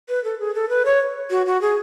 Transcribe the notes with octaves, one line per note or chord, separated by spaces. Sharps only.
B4
A4
G#4
A4
B4
C#5
F#4
F#4
G#4